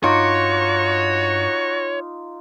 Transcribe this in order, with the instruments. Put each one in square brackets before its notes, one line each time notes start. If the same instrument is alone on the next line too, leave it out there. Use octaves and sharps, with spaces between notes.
[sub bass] G2 [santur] D#4 F4 D6 [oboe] F#4 [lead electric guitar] C#5